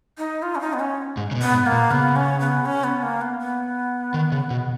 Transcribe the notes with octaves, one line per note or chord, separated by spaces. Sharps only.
D#4
F4
C#4
D#4
B3
C#4
G#2
C#3
B2
B3
G#2
A#3
A#2
C#3 B3
C#4
B3
C#4
B3
A#3
B3
B3
D#3
C#3
B2